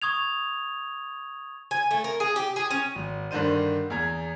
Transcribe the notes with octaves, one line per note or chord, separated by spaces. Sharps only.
C#6 D#6 G#6 F7
G#5
A3
A#4
G#4
G4
G#4
C#4
G#1
G2 D3 D#3 D4 C5 D#7
E2 G#4 A#5 G#6